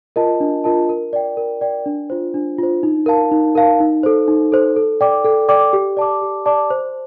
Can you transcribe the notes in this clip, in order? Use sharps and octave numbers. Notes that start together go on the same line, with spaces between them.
F4 A#4 D#5 A5
D4
F4 A#4 D#5 A5
A#4
D5 G5
A#4
D5 G5
D4
F4 C5
D4
F4 C5
D#4
A#4 F5 A5
D#4
A#4 F5 A5
D#4
A4 C5
D#4
A4 C5
A4
D5 G5 D6
A4
D5 G5 D6
G4
D5 A5 D6
G4
D5 A5 D6
C5